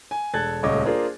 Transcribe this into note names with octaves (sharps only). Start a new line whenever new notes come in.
G#5
E1 A4 F#6 G#6 A6
D#1 C#2 A3 C#5 D#5 D6
A#3 D4 F4 G#4 A#4 C5